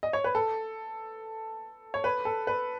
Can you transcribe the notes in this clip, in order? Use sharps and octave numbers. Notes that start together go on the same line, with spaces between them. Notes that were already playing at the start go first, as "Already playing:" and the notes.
D#5
C#5
B4
A4
C#5
B4
A4
B4